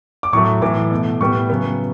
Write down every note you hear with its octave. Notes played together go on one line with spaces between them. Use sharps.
D6
A2 F#3 A3 C#6
A2 E3 A3 D6
B2 A3
A2 G3 B3 C#6
C#3 F#3 B3